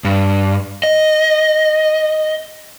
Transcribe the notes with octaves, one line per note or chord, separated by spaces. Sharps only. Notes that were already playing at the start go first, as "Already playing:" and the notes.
G2
D#5